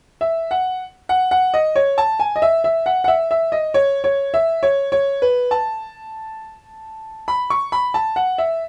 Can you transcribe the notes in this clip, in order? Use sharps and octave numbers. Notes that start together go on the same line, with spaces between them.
E5
F#5
F#5
F#5
D#5
C#5
A5
G#5
D#5
E5
E5
F#5
F#5
E5
E5
D#5
C#5
C#5
E5
C#5
C#5
B4
A5
B5
C#6
B5
A5
F#5
E5